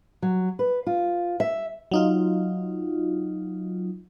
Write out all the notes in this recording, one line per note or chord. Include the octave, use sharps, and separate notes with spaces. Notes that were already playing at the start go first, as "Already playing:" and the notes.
F#3
B4
F4
E5
F#3 D#4 F4